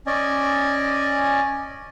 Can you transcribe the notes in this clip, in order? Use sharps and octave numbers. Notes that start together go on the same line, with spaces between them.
C#4 D5 D#5 G#5